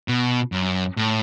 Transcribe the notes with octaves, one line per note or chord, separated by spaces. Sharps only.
B2
F#2
A2